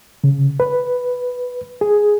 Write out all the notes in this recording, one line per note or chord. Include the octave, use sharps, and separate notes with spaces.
C#3
B4
G#4